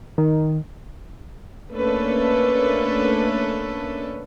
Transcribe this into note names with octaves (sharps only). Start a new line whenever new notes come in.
D#3
A3 A#3 C#4 D4 A4 B4